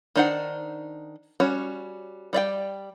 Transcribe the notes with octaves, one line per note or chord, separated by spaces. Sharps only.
D#3 D4 D#4 C5 F#5
G3 C#4 F#4 C#5
G3 D5 E5 G5